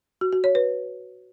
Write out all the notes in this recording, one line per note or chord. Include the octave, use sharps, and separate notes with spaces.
F#4
F#4
C#5
B4